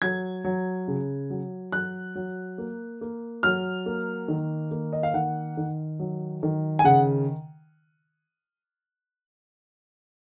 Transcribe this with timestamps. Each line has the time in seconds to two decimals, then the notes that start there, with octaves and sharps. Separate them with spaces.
0.02 F#3 G#6
0.44 F#3
0.88 C#3
1.30 F#3
1.72 F#3 F#6
2.15 F#3
2.58 A#3
3.01 A#3
3.43 F#3 F6
3.86 A#3
4.28 D#3
4.71 A#3
4.93 D#5
5.03 F5
5.14 D#3 F#5
5.57 D#3
5.99 F#3
6.43 D#3
6.79 G#5
6.84 C#3 F#5